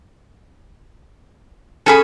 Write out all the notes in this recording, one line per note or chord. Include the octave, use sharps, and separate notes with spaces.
C#4 G#4 A4 B5